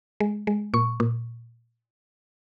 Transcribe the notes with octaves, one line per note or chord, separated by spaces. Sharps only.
G#3
G#3
A#2 C#6
A#2